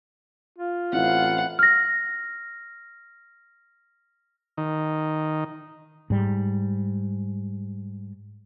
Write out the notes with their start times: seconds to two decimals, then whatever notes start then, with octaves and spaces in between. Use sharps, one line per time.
0.58 F4
0.93 A1 C4 E4 F5 F#5
1.59 F6 A#6
4.57 D#3
6.10 G#2 G3